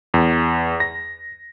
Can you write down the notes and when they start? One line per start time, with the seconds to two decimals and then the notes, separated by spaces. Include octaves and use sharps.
0.14 E2
0.80 A#6